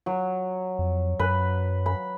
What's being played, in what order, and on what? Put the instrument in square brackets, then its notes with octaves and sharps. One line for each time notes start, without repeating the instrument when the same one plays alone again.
[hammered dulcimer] F#3
[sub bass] F2
[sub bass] F#2 [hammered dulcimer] B4
[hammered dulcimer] B5